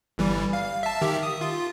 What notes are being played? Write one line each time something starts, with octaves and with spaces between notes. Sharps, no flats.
G1 E3 G3
F5
E5 A5
D#3 G4 E5
D#6
F4